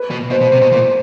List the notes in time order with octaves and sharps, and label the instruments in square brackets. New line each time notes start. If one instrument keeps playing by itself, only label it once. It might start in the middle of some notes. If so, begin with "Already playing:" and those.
Already playing: [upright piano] B4
[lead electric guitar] B2
[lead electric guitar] B2 [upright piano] C5
[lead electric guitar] B2
C3
B2
A#2